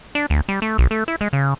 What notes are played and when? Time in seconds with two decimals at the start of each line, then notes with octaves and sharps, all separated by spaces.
0.15 D4
0.30 D2
0.49 G3
0.62 A3
0.78 B1
0.91 A3
1.08 E4
1.21 G#3
1.33 C#3